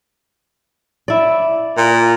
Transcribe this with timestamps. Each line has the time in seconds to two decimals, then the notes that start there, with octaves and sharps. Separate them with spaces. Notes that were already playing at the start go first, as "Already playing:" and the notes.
1.08 E4 D5
1.77 A#2